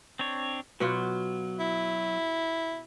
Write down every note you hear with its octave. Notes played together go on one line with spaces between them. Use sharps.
C4 D4 C#5
B2 F#3 B3 F4
E4